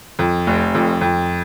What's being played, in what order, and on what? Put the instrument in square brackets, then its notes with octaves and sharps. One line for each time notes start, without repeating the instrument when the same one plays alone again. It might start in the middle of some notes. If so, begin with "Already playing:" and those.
[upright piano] F2
F1
F2
F2